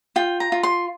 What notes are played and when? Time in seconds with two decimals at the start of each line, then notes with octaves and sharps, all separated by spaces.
0.16 F4 G5
0.40 A#5
0.52 F4
0.63 C6